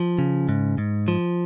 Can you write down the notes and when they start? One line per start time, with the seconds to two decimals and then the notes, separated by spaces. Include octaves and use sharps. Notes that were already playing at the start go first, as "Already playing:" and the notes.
Already playing: F3
0.19 C#3
0.49 G#2
0.78 G#2
1.08 F3